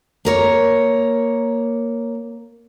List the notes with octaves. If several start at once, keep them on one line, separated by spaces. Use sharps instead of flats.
A#3 A#4 C#5